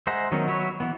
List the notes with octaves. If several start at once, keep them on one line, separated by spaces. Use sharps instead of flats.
G#3 C5 E5 F#5 A#5
D#3 F#3 B3 C#4 D#4
F#3 F#4 B4 C#5 E5
E3 B3